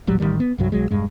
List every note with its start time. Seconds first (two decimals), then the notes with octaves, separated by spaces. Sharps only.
0.07 D#1 A1 F#3 G3
0.20 A1 A#2 D#3 G3
0.40 B3
0.58 C2 G2 F#3
0.72 B1 F#3 G#3
0.91 E1 G2 G#3